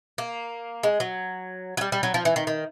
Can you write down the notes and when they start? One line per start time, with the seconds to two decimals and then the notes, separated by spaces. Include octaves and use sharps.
0.18 A#3
0.83 G#3
1.00 F#3
1.77 F#3
1.81 G3
1.92 G3
2.03 F#3
2.14 F3
2.25 E3
2.36 D#3
2.47 D#3